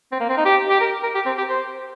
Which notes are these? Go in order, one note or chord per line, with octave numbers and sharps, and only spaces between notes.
C4
A#3
C4
D#4
G4
G4
A#4
A#4
G4
C4
G4
C5